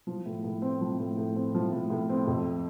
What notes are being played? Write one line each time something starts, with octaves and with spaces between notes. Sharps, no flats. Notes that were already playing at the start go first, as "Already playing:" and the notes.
F3
A2
A2
C4
F3
A2
A2
C4
F3
A2
A2
C4
F2